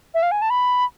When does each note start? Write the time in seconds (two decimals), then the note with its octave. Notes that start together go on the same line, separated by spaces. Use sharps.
0.14 E5
0.23 F5
0.31 G#5
0.42 A5
0.50 B5